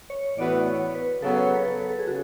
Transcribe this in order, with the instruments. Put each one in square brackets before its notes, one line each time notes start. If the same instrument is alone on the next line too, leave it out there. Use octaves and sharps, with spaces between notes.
[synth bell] C#5
[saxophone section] A2 E3 B3 F#4 B4 [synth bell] D5
[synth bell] C#5
B4
[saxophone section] C#3 F#3 B3 [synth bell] A4
[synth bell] C#5
B4
A4
B4
A4
G#4
[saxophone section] C#3 [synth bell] F#4